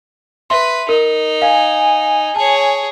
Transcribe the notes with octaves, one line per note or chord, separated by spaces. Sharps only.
B4 E5 C6
D#4 A#4
F5 G#5
G#4 C#5 A5